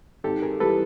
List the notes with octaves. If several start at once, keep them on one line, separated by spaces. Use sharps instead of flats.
G#1 G4 A4
G#4 A#4
E3 G3 A4 B4